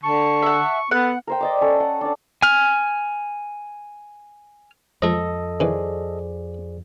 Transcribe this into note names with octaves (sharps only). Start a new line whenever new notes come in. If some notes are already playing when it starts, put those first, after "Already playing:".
D3 A5 C#6
E5 F#5
B3 A4 F#5
A#4 C5 G5
D5 D#5 D6
C#4 A4
F#5
D4 D5
G#5 F6
F2 F3 G#3 A4 D#5
D#3 E3 G#4 C5 D5